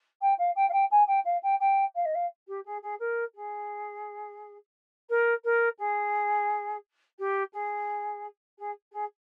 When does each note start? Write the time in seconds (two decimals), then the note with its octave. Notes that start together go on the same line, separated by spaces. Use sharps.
0.21 G5
0.38 F5
0.55 G5
0.69 F5
0.72 G5
0.91 G#5
1.07 G5
1.25 F5
1.43 G5
1.60 G5
1.95 F5
2.05 D#5
2.14 F5
2.47 G4
2.65 G#4
2.82 G#4
2.99 A#4
3.34 G#4
5.09 A#4
5.44 A#4
5.78 G#4
7.18 G4
7.53 G#4
8.58 G#4
8.92 G#4